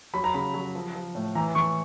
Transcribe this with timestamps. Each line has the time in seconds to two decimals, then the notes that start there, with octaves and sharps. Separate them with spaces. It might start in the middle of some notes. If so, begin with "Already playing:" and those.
0.13 F#3 B5
0.24 A#5
0.34 C#3 B5
0.54 F#3
0.75 F3
0.95 F3
1.15 A2
1.35 E3 A#5
1.55 E3 C#6